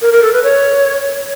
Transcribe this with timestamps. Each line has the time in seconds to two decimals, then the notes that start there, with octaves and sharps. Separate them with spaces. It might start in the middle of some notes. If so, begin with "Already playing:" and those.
0.02 A#4
0.12 A#4
0.23 A4
0.33 B4
0.43 C#5